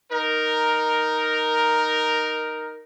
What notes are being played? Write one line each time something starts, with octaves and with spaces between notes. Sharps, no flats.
D#4 A#4